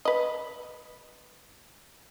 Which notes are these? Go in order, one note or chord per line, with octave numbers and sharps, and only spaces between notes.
B4 D#5